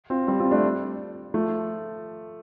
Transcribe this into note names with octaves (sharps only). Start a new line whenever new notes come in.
C4 F4
G3 C4
C4 F4
A3 D4
F3 A3